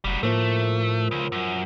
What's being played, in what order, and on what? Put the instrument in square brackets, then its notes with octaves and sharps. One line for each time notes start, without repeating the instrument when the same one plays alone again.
[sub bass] F1 [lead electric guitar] F#3 G3
[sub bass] A2 [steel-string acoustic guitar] F3 A#3 [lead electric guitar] A3
[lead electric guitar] C#2
F#2